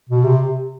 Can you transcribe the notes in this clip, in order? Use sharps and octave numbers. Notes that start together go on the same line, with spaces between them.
B2
C3